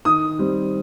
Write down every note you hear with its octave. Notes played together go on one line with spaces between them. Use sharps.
D#3 D#6
G3 C4